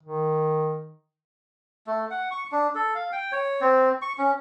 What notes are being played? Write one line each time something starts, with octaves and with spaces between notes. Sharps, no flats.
D#3
A3
F#5
C#6
D4
A4
F5
G5
C#5
C4
C#6
C#4